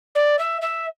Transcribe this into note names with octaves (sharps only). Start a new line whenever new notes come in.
D5
E5
E5